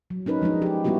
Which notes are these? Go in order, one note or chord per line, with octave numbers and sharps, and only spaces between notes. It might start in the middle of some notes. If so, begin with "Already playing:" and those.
F#3
C#4 D#4 A#4 B4
F3 G#3 D4 D#4
D#4 G4
G3 G#3 B3 E4 F#4 G4